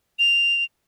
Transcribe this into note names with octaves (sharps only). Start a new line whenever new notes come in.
F7